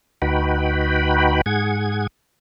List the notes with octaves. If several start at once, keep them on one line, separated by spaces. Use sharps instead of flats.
D2 D#4 F#4 B4 G5 B5
G#2 G#4 F#5 G#6